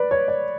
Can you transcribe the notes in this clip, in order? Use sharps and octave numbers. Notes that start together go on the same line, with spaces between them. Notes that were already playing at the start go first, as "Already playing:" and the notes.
Already playing: B4 D5
C#5
D5